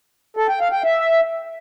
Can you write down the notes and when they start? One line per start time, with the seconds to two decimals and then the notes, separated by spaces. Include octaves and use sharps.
0.37 A4
0.49 G5
0.60 F5
0.72 G5
0.84 E5